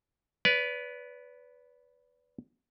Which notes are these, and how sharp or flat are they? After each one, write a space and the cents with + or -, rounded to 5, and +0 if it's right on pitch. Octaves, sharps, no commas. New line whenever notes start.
B4 +0 D5 -35